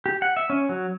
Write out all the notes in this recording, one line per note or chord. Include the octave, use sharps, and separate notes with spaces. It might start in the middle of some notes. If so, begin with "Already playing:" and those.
G4
F#5
E5
C#4
F#3